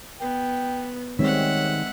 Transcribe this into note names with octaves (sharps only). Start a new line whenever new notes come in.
B3 G5
D#3 G3 G#3 C4 C#5 E5 F#5